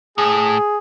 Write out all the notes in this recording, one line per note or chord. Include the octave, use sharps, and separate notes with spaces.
A2 G#4